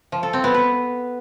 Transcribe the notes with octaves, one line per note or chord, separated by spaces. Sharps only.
F3
A4
C4
B3
B4